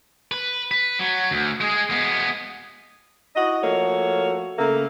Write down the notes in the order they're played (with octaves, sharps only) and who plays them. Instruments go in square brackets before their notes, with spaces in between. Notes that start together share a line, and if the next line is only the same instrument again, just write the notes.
[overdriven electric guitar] B4
B4
F#3
D2
G#3 G#4
G#3 B3
[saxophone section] E4 F#4 D#5
F3 A3 A#3 F#4 C#5
C#3 A3 A#3